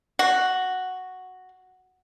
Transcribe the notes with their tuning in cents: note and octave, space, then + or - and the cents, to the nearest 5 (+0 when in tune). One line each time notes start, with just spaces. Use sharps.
F#4 +0